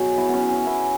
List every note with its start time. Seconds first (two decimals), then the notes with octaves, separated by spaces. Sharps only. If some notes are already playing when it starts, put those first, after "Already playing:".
Already playing: B2 F#3 F#4 G#4 C#5
0.17 B3 E4
0.29 B3 C#4
0.42 E3
0.50 C#4
0.66 B3 E4